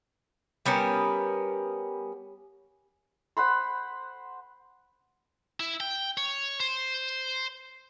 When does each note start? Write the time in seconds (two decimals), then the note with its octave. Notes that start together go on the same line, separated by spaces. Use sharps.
0.66 G3 B3 C#4 A#4
3.37 C5 F#5 B5 C6
5.60 E4
5.80 G5
6.17 C#5
6.60 C5